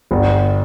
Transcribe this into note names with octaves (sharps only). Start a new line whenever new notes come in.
G1